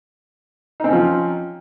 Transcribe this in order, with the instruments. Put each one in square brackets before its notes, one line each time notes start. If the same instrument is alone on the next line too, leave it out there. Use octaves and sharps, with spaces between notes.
[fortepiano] D#4
C4
C#4
F3